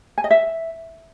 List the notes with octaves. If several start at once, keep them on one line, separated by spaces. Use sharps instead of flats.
G#5
D#5
E5